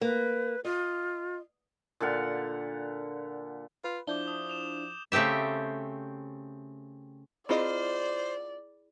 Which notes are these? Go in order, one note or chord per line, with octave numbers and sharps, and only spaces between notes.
A#3 B4
F4 D#5
A#2 D3 F5 F#5
F4 B4
F3 D4 E4 D6 G6 G7
D#6
E7 F7
C#3 A3 C4 G4 E5
C4 E4 F4 G#4 C5 D5 D#5 B5